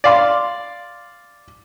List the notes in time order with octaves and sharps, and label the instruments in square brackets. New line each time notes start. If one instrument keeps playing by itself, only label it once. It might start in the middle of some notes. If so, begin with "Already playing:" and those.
[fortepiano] D5 F5 C6